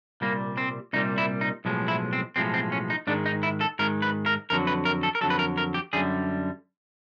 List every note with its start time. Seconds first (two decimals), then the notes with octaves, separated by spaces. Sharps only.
0.21 C2 A#2 G3 A#3
0.58 C4
0.93 C2 A#2 G3 D#4
1.18 E4
1.41 D#4
1.65 B1 A2 F3 G#3
1.88 E4
2.13 C4
2.36 B1 A2 F3 G#3 C4
2.54 C4
2.72 C#4
2.90 D#4
3.07 G#2 D#3 G#3 D4
3.26 D#4
3.43 E4
3.61 A4
3.79 G#2 D#3 G#3 A#4
4.02 B4
4.26 A#4
4.50 F2 D3 F#3 A#4
4.67 B4
4.85 A#4
5.03 A4
5.15 A#4
5.21 F2 D3 F#3 A4
5.30 B4
5.39 A#4
5.57 A#4
5.74 G4
5.93 F#2 D3 G3 G#4